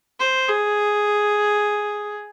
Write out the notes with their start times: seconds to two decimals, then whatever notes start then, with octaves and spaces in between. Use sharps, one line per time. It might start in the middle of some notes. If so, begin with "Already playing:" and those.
0.20 C5
0.49 G#4